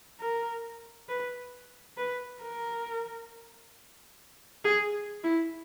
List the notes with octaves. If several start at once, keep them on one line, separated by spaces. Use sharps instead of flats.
A#4
B4
B4
A#4
G#4
E4